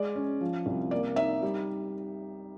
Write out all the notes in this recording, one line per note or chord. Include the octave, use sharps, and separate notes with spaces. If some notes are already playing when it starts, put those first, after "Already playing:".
Already playing: G#3 D5
C#4
F3
C2
A#3 D5
D#4 E5
G3